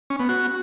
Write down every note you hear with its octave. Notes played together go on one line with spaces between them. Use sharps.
C#4
B3
F#4